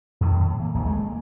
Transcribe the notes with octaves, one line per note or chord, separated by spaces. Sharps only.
F2 A2 C3 D#3
A2
E3 A#3
D1 A#1 D#2 G#2
G#3 A3
A#3